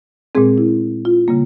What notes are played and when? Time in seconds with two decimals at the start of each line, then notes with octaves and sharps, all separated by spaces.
0.35 A#2 G#3 C4 G#4
0.58 E4
1.05 F4
1.28 C#3 G3 A#3